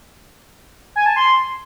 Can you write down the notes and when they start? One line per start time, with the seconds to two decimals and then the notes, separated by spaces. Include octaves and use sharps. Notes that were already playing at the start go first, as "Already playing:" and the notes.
0.96 G#5
1.06 A5
1.16 C6